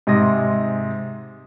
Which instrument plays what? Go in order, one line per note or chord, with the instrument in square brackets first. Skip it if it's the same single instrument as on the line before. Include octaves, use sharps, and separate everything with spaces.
[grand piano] G#2 C3 G#3 C6 D#6 A#6